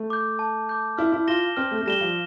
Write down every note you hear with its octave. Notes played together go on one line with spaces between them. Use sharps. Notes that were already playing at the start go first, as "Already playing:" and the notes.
Already playing: A3
D6 G6
A5
D6 G6
E4 F6
E4
F4 A#6 E7 G7
C4 F6
A3
A3
G3 A#6 E7 G7
F3